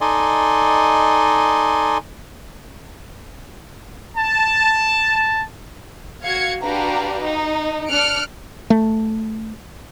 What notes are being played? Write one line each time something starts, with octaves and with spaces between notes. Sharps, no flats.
D#4 A4 D5 D#5 G#5 C6
A5
F#4 F5 G#6 C#7
D4 F#4 G4 B4 F5 A#5
D#4
D4 F6 F#6 C#7 D7
A3